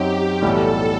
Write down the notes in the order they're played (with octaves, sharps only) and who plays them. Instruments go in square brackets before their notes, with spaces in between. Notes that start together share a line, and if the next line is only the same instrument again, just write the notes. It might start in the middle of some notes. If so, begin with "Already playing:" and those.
Already playing: [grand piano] F#2 F#3 C4 D#4 [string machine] G4
[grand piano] B1 A2 E3 G3 [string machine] A4